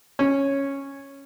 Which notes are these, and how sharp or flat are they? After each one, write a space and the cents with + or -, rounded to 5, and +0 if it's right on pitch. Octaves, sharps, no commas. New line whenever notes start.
C#4 -5